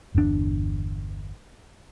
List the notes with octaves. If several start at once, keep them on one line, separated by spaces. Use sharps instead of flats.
G1 E2 A#2 D4